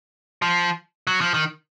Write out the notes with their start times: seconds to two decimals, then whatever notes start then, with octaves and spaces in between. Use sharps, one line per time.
0.42 F3
1.07 F#3
1.21 F3
1.34 D#3